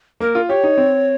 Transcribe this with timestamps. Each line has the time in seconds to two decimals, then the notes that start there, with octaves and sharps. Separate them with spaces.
0.20 A#3 A#4
0.35 F4
0.49 G4 C#5
0.64 D#4
0.78 C4